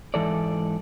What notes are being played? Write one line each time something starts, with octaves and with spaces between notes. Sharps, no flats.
G#2 E3 A4 D5